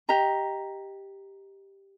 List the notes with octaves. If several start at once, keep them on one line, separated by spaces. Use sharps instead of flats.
G4 D#5 A#5